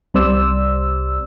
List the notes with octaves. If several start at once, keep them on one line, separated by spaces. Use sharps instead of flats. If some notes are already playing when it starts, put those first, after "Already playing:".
C2 C3 G3 C5 D5 E6